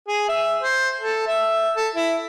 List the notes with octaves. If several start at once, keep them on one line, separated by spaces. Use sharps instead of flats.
G#4
E5
C5
A4
E5
A4
E4